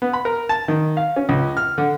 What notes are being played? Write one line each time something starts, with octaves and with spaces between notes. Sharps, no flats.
B3
B5
A#4
A5
D#3
F5
C#4
C#2
F6
D3